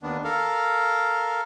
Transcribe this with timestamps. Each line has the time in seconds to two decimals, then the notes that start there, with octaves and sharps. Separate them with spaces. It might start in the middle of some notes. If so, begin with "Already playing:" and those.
0.03 D#2 D#3 B3 D4
0.24 A4 A#4 F5